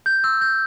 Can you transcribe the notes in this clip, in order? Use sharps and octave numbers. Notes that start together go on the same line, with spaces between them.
G6
E6
G6